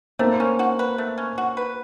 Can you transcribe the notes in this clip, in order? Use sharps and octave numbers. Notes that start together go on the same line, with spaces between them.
A3 A#3 C4
C#4
F#4
B4
A3
C#4
F#4
B4